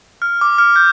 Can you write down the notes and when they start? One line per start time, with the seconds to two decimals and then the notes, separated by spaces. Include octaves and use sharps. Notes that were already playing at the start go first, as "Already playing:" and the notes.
0.22 F6
0.41 D6
0.58 F6
0.76 G6